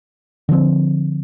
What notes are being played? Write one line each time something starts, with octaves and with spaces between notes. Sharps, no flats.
D3 F3 C4